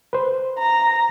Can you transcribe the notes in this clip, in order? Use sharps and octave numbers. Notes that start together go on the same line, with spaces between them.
B4 C5
A#5